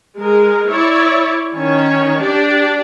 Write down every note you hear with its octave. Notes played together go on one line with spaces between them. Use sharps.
G#3 A#4
E4 C#5 D5
D#3 C#4 C#5
D4 G4 D5